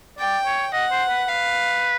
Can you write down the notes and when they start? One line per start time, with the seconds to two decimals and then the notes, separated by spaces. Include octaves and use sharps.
0.19 D5 G5
0.46 C#5
0.73 D#5 F#5
0.91 C5
1.10 B4
1.28 B4 F5